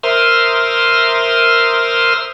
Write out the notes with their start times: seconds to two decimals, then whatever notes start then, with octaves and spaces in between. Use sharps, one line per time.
0.03 A#4 C5 E5 C6 D#6 F6